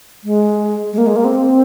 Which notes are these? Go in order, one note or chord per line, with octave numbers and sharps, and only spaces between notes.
G#3
G#3
A#3
G#3
A#3
C4